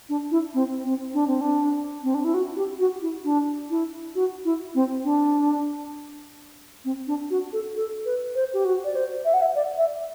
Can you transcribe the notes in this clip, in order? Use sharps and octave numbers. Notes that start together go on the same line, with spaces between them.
D4
E4
C4
C4
D4
C4
D4
C4
D4
E4
F#4
G4
F#4
E4
D4
E4
F#4
E4
C4
D4
C4
D4
F#4
A4
A4
B4
C5
G4
F#4
D5
C5
E5
F#5
E5
D5
E5